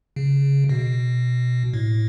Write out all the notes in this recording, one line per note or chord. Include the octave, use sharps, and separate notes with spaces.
C#3
B2
A2